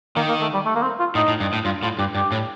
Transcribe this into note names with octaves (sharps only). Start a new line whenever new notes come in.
D#3 A#3
A#3
A3
G3
A3
A#3
C4
F4
A2 D#4
A2
G2
A2
G2 F4
A2 F4
G2 G4
G2 G4
A2